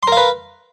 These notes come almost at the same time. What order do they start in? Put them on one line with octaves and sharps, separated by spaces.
C6 A#4 F5 B4